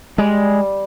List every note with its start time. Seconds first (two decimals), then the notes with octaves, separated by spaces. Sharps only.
0.18 G3 G#3